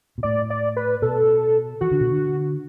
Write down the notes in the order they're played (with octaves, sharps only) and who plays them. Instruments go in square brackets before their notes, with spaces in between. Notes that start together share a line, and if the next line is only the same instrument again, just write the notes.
[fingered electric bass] B2
[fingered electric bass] A2 [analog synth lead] D5
[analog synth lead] D5
B4
[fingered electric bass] B2 [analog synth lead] A4
[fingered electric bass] E3 [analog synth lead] F#4
[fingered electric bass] D3
B2
D3